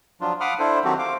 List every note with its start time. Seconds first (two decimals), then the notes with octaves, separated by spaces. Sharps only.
0.21 F3 F#3 D4 F4
0.40 F5 F#5 B5 D6 D#6 F6
0.59 D4 E4 A4 C5
0.85 D#3 F#3 C4 F#4 G4 A4
0.98 C5 F5 D6